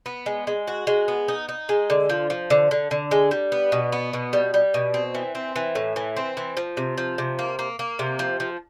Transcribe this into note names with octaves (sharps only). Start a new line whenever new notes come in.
B3
G#3
G#3
F#4
G#3
B3
D#4
D#4
G#3
D3
F3
F3
D3
D3
D3
G#3
G3
B3
B2
B3
B2
G3
G3
B2
C4
E3
C4
E3
A2
E3
C4
E3
F3
C3
F3
C3
A#3
A#3
A#3
C3
F3
F3